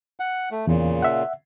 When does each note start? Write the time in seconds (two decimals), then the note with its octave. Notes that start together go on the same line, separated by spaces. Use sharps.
0.20 F#5
0.51 A3
0.67 E2 A#2 C#3
1.02 E5 F#5